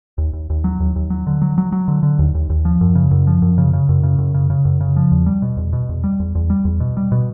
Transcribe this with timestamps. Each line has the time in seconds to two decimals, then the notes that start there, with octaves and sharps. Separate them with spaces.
0.18 D#2
0.33 D#2
0.50 D#2
0.64 F#3
0.80 D#2
0.96 D#2
1.10 F#3
1.27 D3
1.42 F#3
1.58 F#3
1.72 F#3
1.88 D3
2.03 D3
2.19 D#2
2.35 D#2
2.50 D#2
2.65 F3
2.81 F#2
2.95 C#3
3.11 F#2
3.27 F3
3.42 F#2
3.58 C#3
3.73 C#3
3.89 F#2
4.03 C#3
4.18 F#2
4.34 C#3
4.50 C#3
4.65 F#2
4.81 C#3
4.96 F3
5.12 E2
5.26 G3
5.42 B2
5.57 E2
5.73 B2
5.89 E2
6.04 G3
6.20 E2
6.35 E2
6.50 G3
6.65 E2
6.80 B2
6.97 G3
7.12 B2